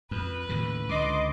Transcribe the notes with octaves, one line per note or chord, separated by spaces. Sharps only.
F2 B4
D#2 A2 C#3
C#2 D3 D#5 C6 D6